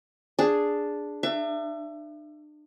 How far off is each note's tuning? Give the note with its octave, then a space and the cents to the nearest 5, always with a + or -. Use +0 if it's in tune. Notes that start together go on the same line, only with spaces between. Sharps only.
D4 +0 G#4 +0
D4 +40 E5 +30